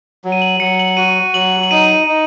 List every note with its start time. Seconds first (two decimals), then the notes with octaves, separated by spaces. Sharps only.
0.24 F#3
0.32 D#7
0.42 F#7
0.60 F#3 C#7
0.79 F#7
0.97 F#4 D#7
1.34 F#3 F#7
1.63 F#7
1.71 D#4 D#7
2.07 D#4